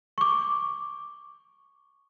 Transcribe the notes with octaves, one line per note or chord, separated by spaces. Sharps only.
C#6 D6